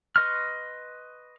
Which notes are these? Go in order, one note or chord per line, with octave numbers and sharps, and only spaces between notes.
B4 D#5 C6 C#6 F6